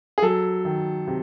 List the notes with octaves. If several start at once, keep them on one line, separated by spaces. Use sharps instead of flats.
G#4
F#3 A4
D#3
C3